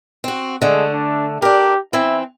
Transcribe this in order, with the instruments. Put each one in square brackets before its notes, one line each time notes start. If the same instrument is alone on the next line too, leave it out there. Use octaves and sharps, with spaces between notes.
[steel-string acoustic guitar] C4 F#4
[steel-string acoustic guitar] D3 A3 [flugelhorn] G#3
[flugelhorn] D4
[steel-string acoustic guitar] D4 A#4 [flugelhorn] G4
[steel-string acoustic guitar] E3 C4 [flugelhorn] E4